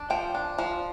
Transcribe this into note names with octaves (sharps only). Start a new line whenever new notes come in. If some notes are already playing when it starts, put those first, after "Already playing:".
Already playing: D4
F3 G5
D4
F3